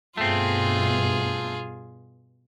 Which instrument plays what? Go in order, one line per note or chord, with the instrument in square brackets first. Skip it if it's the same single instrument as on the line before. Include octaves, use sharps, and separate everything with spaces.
[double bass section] G2 B2 [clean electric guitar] A3 C4 [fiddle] F4 G#4